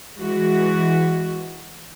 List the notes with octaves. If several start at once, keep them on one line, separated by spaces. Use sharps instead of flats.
E3 G#3 F#4